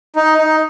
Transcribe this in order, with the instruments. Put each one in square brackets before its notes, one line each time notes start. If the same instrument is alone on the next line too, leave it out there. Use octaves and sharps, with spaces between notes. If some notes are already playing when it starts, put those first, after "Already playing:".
[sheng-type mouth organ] D#4
D#4